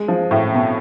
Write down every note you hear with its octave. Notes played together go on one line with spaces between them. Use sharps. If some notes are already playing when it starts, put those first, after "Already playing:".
Already playing: G#3
F3
A2
B2